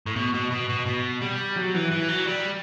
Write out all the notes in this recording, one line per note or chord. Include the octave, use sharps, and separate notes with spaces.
A2
B2
B2
B2
B2
B2
G3
F#3
E3
E3
F#3
G3